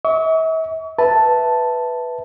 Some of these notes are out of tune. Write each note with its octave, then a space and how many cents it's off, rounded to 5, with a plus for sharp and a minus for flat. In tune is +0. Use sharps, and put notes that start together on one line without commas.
E5 -40 C#6 +35
B4 +0 E5 +0 A5 +0